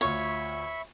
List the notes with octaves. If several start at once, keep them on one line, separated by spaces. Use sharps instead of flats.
D2 F4 C#5 E5 B5 C#6